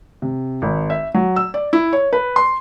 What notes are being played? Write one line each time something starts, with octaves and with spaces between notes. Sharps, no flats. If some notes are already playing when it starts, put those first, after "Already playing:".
C3
G#1
E5
F#3
E6
D5
E4
C#5
B4
C6